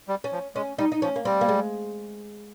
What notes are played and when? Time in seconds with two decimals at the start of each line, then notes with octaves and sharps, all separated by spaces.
0.08 G3
0.24 C#4
0.32 F3
0.55 G#3 C#4
0.78 G3 D#4
0.92 D#4
1.02 F3 C#4
1.16 A#3
1.25 G3 C4
1.41 A#3
1.48 G#3